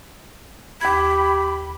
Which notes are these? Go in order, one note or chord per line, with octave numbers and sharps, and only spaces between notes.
D#2 G4 B5 G#6